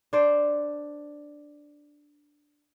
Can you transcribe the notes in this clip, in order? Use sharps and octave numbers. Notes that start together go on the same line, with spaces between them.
D4 C5 D5